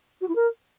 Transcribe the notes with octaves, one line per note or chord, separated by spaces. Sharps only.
F#4
E4
A#4